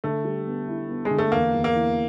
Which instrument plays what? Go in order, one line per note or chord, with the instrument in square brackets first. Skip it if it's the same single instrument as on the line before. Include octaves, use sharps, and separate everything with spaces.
[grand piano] D3 [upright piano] A3
[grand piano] G3
B3
E4
B3
[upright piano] G#3
[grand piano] D3
[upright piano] A3
[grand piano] E2 [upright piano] A#3
[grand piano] E2
[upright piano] A#3
[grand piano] E3